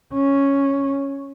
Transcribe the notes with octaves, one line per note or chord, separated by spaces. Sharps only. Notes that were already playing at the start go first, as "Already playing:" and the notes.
C#4